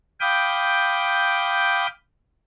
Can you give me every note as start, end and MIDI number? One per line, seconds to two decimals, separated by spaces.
0.20 1.87 77
0.20 1.87 79
0.20 1.87 83
0.20 1.87 86
0.20 1.87 87
0.20 1.87 91